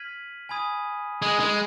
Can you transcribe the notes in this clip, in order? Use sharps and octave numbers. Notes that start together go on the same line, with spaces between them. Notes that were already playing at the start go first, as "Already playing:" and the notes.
Already playing: F6 G#6 B6 D#7 F#7
G#5 B5 D#6 G#6 D#7
G#3 G#5 B5 D#6 G#6 D#7
G#3